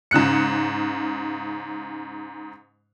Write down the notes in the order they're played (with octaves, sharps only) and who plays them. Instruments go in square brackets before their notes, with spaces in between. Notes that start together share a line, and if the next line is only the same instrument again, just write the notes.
[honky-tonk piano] G#2 C#3 F#6 C#7